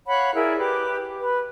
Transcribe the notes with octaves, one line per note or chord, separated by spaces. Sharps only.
C#5 F5 F#5 B5
E4 G#4 A#4 D5
G4 B4 D6
B4